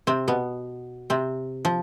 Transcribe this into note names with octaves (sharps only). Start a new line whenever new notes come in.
C3 C4
B2 B3
C3 C4
F3